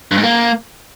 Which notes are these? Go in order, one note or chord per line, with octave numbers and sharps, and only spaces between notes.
G2
G#2
A#3